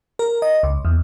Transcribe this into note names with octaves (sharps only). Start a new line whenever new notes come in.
A#4
D#5
C#2
E2